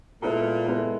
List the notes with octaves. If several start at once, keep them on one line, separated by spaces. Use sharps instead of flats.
A#2 G#3 B3 E4 A4
G#3 B3 E4 A4